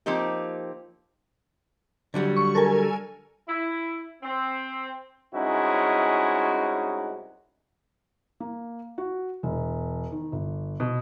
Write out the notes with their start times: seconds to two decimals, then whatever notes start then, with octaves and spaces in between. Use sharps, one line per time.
0.06 F3 A#3 C4 D#4 G4
2.14 D3 F#3 G3
2.37 C#6
2.55 A4 A#4 G#5
3.49 E4
4.23 C4
5.34 C2 G#3 C#4 D#4 E4 F#4
8.40 A#3
8.98 F#4
9.43 E1
10.12 D#3
10.32 G1
10.80 B2